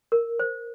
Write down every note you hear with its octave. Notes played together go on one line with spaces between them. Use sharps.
A#4
C5